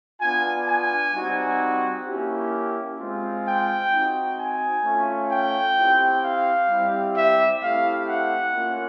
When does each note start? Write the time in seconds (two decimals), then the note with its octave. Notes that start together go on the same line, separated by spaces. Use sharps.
0.21 B3 D4 F4 G#5
0.67 G#5
1.13 G3 C4 D#4 F#4
2.07 A#3 C#4 E4 G4
2.99 G#3 C4 F4
3.45 G5
3.91 C4 D#4 F#4
4.38 G#5
4.85 A3 C#4 F4
5.30 G5
5.77 C4 E4 G4
6.23 F5
6.70 G3 C4 E4 G4
7.16 E5
7.62 A3 C4 E4 G4 F5
8.08 F#5
8.55 A#3 C#4 F4